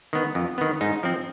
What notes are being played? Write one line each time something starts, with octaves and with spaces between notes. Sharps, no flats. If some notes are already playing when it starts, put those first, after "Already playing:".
D#3 B3
F2
D#3 B3
G#2 D#4
F3 C4